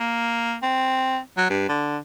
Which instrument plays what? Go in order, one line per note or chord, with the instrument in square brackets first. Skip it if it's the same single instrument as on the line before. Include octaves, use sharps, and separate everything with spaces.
[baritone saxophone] A#3
C4
F#3
G2
D3